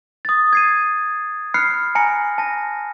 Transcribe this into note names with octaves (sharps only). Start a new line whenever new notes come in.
D#6 A6
G#6 C7 D#7
B5 F6 F#6 C7 C#7
G#5 A#5 A#6 C#7
A5 A#6